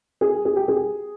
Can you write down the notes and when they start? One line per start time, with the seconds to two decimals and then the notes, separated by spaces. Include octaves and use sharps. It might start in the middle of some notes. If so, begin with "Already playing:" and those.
0.21 G#4
0.45 G#4
0.56 G4
0.68 G#4